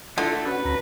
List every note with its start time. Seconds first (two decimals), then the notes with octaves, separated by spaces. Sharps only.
0.18 D3 A3 E4 F4 A4
0.45 C#4 F#4 B4
0.65 D2 C#4 A#5